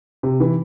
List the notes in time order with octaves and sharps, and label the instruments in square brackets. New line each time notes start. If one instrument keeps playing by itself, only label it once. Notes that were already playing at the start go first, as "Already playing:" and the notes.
[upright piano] C3
E3